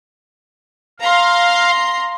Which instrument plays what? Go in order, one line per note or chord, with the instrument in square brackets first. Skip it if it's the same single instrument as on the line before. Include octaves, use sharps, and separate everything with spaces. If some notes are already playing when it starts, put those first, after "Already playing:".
[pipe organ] F5 [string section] A#5 C6